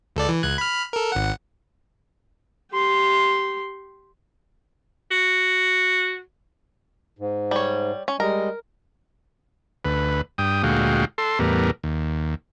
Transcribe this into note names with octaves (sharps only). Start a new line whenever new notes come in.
C#2 A4 D5
E3
C#2 F#6 G#6
B5 F6
A4 A#4
G#1 F#5
G4 C6
F#4
G#2
G3 C#5
C#4
G3 G#3 A#4 D#5
D2 B4
G2 G5 D#6
D2 A#2 G#3 F#4 F5 G5
A4 C6
E2 A2 G3 B3 A#4
D#2